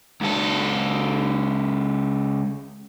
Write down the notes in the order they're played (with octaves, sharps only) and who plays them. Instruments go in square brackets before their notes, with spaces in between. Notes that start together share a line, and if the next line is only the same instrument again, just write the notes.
[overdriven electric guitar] C#2 A4